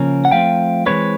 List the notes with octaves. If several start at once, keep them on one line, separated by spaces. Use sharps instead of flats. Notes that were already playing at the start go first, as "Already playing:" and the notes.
Already playing: C#3 F3 A#3 C#4
F#5
F3 A3 C4 F5 G5
E3 G#3 C4 B4 C#5